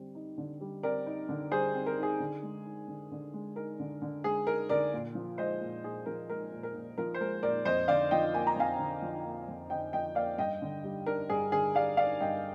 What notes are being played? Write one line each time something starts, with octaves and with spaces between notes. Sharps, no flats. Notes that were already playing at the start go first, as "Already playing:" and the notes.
Already playing: D3 G3 C4
D#4
D3
G3
C4 A#4 D5
D#4
D3
G3 G#4 C5
C4
A#4
D#4
G#4
D3
G#3
D#4
D3
D3
G#3
D#4 A#4
D3
D3
G#3 G#4
D#4 A#4
D3 A#4 D5
A#2
F3
G#3 C5 D#5
A#2
A#2 G#4
F3 A#4
G#3 A#4
A#2
A#4
A#2
F3 A#4
C5
G#3 A#4
A#2 A#4 D5
F2 C5 D#5
D3 D5 F5
F3 D#5 G5
A#3 G#5
A#5
F2 F5 G#5
D3
F3
A#3
F2
D3 D#5 G5
F3 D#5 G5
A#3 D5 F5
G2 D#5 G5
D3
G3
D4 A#4
G2 G#4
D3 G#4
G3 D5 F5
D4 D5 F5
G2 D#5 G5